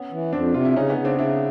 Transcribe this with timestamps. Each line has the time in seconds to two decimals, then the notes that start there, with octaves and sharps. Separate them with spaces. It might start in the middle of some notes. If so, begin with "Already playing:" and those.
Already playing: B3 C#4
0.11 E3
0.33 F2 C4 D4
0.54 C3 F4
0.65 E4
0.76 C#3 C#4 D#4
0.90 B3 C#4
0.98 C#3
1.05 C4 D4
1.19 C#3 D4 E4